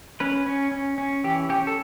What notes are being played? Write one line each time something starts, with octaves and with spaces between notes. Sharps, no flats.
C#4 B4
C#4
C#4
C#4
E3 G4
C#4 G4
A4